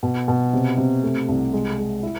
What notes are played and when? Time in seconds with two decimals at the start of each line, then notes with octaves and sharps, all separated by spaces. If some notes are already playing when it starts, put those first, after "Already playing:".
0.03 B2
0.28 B2
0.53 C3
0.77 C3
1.03 A3
1.28 C2
1.53 G#3
1.78 G#3
2.03 E4